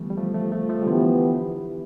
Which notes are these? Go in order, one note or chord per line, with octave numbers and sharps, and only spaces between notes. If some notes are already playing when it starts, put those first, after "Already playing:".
Already playing: D3 E3 F3 G3 A3 B3
G3
F3 A3
F3 A3
F3 A3
F3 A3
G3
D3 E3 F3 B3 E4 G4